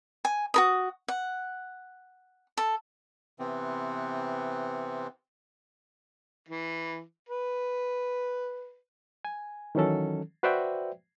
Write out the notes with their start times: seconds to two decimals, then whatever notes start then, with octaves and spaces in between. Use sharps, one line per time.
0.25 G#5
0.54 F#4 A#4 D#6
1.08 F#5
2.58 A4
3.39 C3 E3 B3 C4
6.49 E3
7.29 B4
9.25 G#5
9.75 D#3 E3 F#3 C#4 A4
10.43 F#4 B4 C5 D5 E5 G5